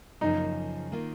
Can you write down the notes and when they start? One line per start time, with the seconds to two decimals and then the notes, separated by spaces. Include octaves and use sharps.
0.21 F#2 C#3 F3 A#3 D#4
0.92 D#3 A#3 F4